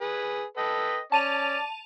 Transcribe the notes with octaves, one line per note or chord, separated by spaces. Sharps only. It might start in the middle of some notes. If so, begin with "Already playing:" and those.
G#4 B4
A4 B4 D#5 G5
C#4 D5 A5 D#7 F7